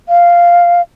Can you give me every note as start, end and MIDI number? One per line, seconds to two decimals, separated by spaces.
0.09 0.81 77